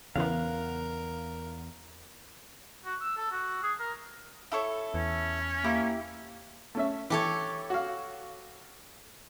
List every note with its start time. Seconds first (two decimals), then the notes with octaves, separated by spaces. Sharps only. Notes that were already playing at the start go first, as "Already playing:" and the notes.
0.16 E2 C#3 E3 B3 A#4 F5 F#5
2.85 F#4
3.01 E6
3.17 A4
3.32 F#4
3.63 G#4
3.80 A#4
4.52 E4 A4 C#5
4.94 E2 C#4
5.64 A#3 E4 G4
6.75 A3 C#4 E5
7.10 E3 G4 A4 C#5
7.70 F#4 F5